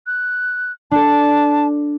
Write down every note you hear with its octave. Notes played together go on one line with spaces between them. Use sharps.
F#6
D4 A4 A5